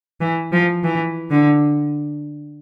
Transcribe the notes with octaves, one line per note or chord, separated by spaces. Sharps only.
E3
F3
E3
D3